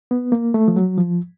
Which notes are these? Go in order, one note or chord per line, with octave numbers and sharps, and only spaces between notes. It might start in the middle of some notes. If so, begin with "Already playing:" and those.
B3
A#3
A3
F3
F#3
F3